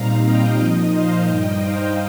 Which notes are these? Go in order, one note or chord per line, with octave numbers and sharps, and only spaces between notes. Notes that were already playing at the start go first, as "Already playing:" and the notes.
Already playing: A#2 G3 C4 D#4 F5 A#5
D#5 G5
A#2 F3 D#4 D#5
C5 F5
G2 G3 D#4 D#5 G5
C5 F5